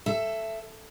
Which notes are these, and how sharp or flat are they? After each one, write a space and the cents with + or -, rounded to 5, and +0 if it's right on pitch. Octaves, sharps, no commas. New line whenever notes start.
A4 +0 E5 +15